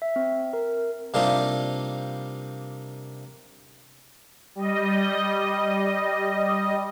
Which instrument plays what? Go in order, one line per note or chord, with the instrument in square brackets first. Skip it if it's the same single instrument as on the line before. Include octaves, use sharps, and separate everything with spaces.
[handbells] E5
C4
A#4
[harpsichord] C3 G3 A#3 D4 D#4 F4
[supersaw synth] G3 D#5